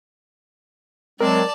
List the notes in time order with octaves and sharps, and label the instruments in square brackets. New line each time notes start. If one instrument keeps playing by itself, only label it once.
[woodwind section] F#3 G#3 C4 [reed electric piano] A#4 [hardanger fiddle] D5 A5